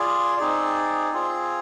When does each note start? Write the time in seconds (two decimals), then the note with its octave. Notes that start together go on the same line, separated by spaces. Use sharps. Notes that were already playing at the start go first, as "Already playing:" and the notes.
Already playing: F4 G#4 D5
0.37 C4 D#4 G#4 D5
1.13 C4 F4 G#4